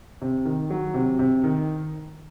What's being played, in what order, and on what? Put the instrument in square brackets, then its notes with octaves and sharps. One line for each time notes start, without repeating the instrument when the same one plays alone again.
[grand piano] C3
D#3
F#3
C3
C3
D#3